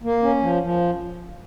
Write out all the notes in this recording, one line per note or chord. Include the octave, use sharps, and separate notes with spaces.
A#3
C#4
F3
F3